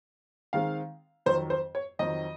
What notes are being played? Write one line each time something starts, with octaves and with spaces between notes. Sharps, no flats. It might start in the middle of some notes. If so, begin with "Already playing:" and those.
D#3 G#3 C4 D#4 F5
F2 D#3 F#3 C4 C5
C5
C#5
F2 D#3 F#3 C4 D#5